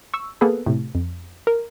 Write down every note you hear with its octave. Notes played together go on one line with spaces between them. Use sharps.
C#6 E6
A#3 B3 G#4 A4 B4
A2 C3
F2
A#4